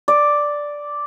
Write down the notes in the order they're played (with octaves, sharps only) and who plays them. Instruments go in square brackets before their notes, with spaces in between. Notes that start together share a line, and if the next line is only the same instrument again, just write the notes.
[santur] D5